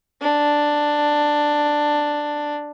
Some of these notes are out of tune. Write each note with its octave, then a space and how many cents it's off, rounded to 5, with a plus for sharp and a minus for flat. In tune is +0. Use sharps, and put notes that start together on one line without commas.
D4 +5